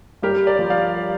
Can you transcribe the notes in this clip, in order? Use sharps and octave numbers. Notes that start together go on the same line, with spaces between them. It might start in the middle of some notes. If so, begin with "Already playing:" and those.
G2 G4 A#4
A#4 D5
F3
D5 F5